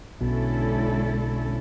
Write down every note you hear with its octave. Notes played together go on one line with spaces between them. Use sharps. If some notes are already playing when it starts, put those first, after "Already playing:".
B1 B2 D3 G#3 C#4 E4 A4